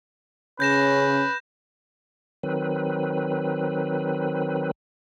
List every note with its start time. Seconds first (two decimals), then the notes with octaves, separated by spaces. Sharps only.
0.60 C#3 C#4 B4 G6 A#6 E7
2.43 D#3 F#3 C4 B4